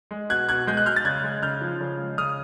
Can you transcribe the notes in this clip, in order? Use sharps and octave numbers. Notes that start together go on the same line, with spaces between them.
G#3
B2 F#6 G#6
B2 F#6 G#6
G#3 G6
F#6
G#3 F6 G6
A6
C#3 F#6 G#6
G#3
C#3 F6 G6
F3
C#3
G#3
C#3 D#6 F6